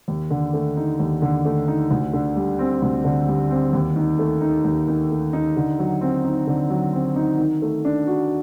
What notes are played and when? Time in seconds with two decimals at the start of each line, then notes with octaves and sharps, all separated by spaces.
0.08 D#2
0.30 D3
0.53 A3
0.77 D#4
0.99 D#2
1.22 D3
1.45 A3
1.68 D#4
1.91 D2
2.13 D3
2.36 G3
2.59 C4
2.82 D2
3.04 D3
3.28 G3
3.50 C4
3.73 D#2
3.96 D#3
4.19 A3
4.41 D#4
4.65 D#2
4.88 D#3
5.10 A3
5.33 D#4
5.56 D3
5.79 F#3
6.01 C4
6.24 D#4
6.47 D3
6.70 F#3
6.93 C4
7.16 D#4
7.38 D#3
7.62 A3
7.85 D4
8.07 F#4